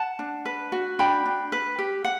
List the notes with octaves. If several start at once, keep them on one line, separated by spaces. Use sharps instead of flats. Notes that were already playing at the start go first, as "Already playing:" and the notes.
Already playing: F#5 A5
D4
B4
F#4
D4 G5 B5
D4
B4
G4
F#5